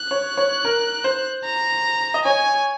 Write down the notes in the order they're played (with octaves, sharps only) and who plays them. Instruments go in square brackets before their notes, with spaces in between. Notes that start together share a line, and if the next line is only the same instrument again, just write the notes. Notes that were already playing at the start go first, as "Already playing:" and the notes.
Already playing: [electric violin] F#6
[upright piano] C#5
C#5
A#4
C5
[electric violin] A#5
[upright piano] D#5
[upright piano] C#5 [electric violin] G#5